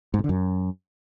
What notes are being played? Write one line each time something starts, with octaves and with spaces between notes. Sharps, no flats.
G#2
B2
D3
F#2